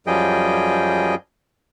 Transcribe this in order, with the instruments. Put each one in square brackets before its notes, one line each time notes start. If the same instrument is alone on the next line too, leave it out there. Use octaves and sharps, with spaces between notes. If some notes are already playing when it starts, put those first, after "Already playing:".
[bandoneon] F#2 F3 G3 G#4 D#5 G5